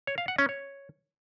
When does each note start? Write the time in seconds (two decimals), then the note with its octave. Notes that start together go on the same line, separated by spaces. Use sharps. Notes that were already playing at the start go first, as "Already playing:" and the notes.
0.07 C#5
0.18 F5
0.28 F#5
0.38 C#4
0.49 C#5